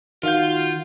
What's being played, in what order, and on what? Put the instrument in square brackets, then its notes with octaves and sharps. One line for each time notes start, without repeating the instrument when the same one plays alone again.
[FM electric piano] D#3 F5 G6 [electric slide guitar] F4 [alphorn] F#4